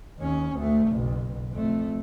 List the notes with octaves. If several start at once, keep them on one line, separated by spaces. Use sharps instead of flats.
D#2 C#4
D2 A3
F#1 B1
F2 A3